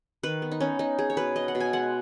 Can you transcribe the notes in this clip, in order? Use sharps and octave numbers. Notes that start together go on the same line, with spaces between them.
D#3 B4
B3
D#4
B3 C#4
B3 D#4
B3 G#4
C#5
B2 B4
B3 D#5
F#5
B2
G#5
G#3 F#5